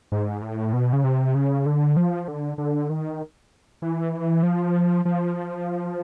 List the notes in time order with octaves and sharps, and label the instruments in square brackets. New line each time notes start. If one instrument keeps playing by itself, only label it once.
[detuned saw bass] G#2
A2
B2
C#3
C3
C#3
D3
F3
D3
D3
D#3
E3
F3
F3